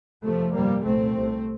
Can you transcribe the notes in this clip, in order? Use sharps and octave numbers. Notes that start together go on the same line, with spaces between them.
F1 F2 C3 F3 A3
G1 F2 C3 G3 A#3
C2 A#2 A3 C4
C2 C3